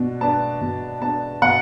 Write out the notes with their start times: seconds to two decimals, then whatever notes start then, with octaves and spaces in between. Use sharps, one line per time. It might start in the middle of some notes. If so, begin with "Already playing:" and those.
Already playing: B2 B3 D4
0.21 B3 D4 A5
0.61 B2
1.01 B3 D4 A5
1.42 B2 F#5